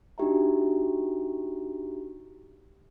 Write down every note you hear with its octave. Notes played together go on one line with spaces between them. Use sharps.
D4 D#4 F#4 G4 E5 A#5